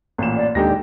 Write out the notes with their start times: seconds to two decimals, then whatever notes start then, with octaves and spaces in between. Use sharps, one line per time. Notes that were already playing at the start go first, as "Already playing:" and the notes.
0.18 A1 A#2 E7
0.35 D5
0.55 D#2 G#2 D3 G4 A#6